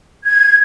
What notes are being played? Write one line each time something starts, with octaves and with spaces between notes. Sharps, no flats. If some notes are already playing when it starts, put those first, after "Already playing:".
G#6